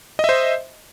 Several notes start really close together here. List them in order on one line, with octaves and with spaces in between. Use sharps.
D#5 E5 C5